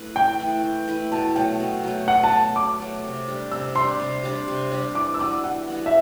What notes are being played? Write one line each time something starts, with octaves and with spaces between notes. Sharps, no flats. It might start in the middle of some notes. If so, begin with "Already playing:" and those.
Already playing: A3 E4 B4
E3 G5
A3 E4 B4
E3
A3 E4 B4
B2 A5
F#3 A3 G5
B2
F#3 A3
B2 F#5
A5
F#3 A3
B2 D6
F#3 A3
C3
G3 D4 G4
C3 E6
G3 D4 G4 C6
C3
G3 D4 G4
C3
G3 D4 G4
E3 D6
E6
G3 B3 F#4 D6
E3 F#5
G3 B3 F#4
E5